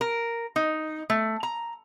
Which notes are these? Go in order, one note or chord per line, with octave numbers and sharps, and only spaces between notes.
A#4
D#4
A3
A#5